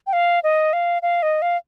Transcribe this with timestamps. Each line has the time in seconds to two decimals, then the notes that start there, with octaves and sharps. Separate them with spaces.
0.07 G5
0.13 F5
0.43 D#5
0.73 F5
1.02 F5
1.23 D#5
1.42 F5